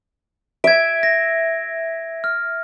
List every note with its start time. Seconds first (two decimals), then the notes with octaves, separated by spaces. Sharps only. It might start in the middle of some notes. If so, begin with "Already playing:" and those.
0.64 E5 G#6 D7
1.03 A#6
2.24 F6